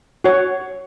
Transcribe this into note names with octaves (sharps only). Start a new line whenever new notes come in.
F#4 C#5